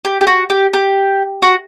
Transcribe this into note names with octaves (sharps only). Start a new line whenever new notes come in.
G4
G4
F#4
G4
G4
F#4